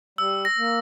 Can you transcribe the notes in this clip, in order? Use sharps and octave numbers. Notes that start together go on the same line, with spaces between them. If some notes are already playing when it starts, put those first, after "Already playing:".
G3 E6
A#6
A#3